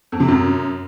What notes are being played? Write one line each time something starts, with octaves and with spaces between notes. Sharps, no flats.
F2
C3
F#2